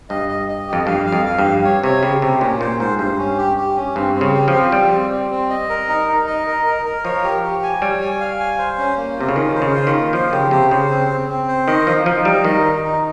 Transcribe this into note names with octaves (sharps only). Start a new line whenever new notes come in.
G2 D#5
D#5
D#5
G4
F2
G2 F5
F5
F2
F5
G2
G4
C#5
C3 C#5
C#3 G4
C3 G4
A#2 C#4
A#2 C5
G#2 C5
G2 C5
C#4
G4
G4
C#4
G2 C4
C4
C#3
G4
F3
C4
G3 G4
C4
C4
C4
D#5
A#4
D#4
D#4
D#5
A#4
A#4
A#4
F3 C#5
G4
G4
G#5
G3 C#5
G#5
F5
G#5
C5
C#4
A#3
C3 F4
C#3
D#3 C#4
C5
C#3
F4
D#3
A#3
F3 C5
C#3 G4
C3 C5
C#3 C5
C4
C4
C4
C5
D#3 D#5
F3 D#4
F3 D#4
G3 D#4
D#3 D#5
D#4
D#4